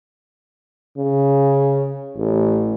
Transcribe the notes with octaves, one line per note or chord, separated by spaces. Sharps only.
C#3
A1